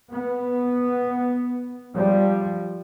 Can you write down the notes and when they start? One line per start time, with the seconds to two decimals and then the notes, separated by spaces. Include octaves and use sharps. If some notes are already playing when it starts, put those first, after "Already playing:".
0.11 B3
1.94 F3 G3